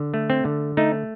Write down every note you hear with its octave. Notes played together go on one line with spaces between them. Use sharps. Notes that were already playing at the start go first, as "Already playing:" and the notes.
Already playing: D3
A3
C4
D3
A3 D#4